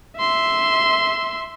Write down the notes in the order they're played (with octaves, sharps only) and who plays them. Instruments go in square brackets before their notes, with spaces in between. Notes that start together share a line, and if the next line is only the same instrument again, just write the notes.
[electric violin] E5 C6